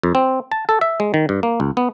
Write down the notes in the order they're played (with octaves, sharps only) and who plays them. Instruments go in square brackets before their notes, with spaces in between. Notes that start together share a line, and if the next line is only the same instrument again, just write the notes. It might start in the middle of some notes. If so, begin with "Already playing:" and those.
[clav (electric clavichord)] F2
C4
A5
A4
E5
G#3
D#3
G2
A#3
C#2
B3